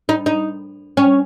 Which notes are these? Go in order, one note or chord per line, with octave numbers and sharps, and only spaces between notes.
D#4
D#4
C#4